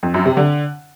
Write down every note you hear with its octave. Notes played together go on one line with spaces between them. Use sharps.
F2
F#2
C3
D3